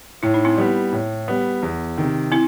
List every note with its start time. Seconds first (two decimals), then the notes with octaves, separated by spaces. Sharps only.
0.23 A2 E4
0.34 D#4
0.45 C4 E4
0.58 G3 B3
0.93 A2
1.28 G3 B3
1.63 E2
1.98 C3 D#3
2.32 C4 E4